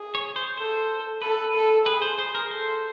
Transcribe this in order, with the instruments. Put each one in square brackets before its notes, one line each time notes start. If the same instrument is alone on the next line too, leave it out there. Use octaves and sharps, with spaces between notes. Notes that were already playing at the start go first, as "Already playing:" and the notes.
Already playing: [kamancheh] G#4
[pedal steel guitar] C#5
C5
[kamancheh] A4 [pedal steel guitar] C5
[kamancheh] A4 [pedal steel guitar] B4
[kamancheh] A4
[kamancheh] G#4 [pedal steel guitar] B4
[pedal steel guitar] C5
C5
A#4
[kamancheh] A4 [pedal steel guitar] C5